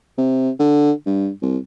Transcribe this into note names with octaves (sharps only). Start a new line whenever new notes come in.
C3
D3
G2
C2